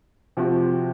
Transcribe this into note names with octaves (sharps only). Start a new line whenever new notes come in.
C3 F3 C4 F#4